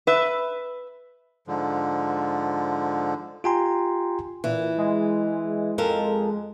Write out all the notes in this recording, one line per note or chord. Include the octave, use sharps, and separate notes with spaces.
B4 E5
G#2 D3 F3
F4 G4 G5 G#5 A#5 C6
A#2 E3
G#3
F2 A4 A#4